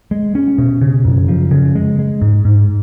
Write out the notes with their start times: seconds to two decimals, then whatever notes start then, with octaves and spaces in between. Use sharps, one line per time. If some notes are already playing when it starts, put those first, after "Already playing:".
0.11 G#3
0.35 C#4
0.58 B2
0.81 C#3
1.05 F#2
1.28 F3
1.51 C#3
1.75 G#3
1.99 G#3
2.22 G#2
2.45 G#2